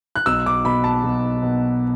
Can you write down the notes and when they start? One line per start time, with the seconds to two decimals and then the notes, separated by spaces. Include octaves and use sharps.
0.16 F#6
0.26 B1 E6
0.46 D6
0.65 B2 B5
0.84 A5
1.04 B1
1.42 B2